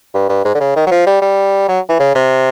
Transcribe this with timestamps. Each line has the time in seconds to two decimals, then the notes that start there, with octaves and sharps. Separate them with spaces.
0.14 G2
0.29 G2
0.45 G#2
0.55 D3
0.60 C#3
0.76 D#3
0.86 F#3
0.91 F3
1.06 G3
1.22 G3
1.68 F#3
1.89 E3
2.00 C#3
2.15 C3